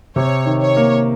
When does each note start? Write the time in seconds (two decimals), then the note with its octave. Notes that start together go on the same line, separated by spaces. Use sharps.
0.16 C3 C#5
0.46 D#3
0.61 C#5
0.77 A#3